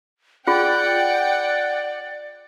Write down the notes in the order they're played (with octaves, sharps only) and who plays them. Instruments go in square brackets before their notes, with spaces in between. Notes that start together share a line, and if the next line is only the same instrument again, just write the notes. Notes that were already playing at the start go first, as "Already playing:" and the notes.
[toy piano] F4 G#4 [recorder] D5 [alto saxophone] F#5 [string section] G5